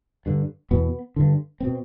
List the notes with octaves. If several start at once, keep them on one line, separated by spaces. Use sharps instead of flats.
G2 D3
E2 B2 B3
G2 D3
B2 C4